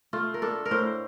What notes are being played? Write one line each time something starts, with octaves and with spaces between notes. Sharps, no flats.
A3 F4
A#4
D4 A4
A#4
A2 C5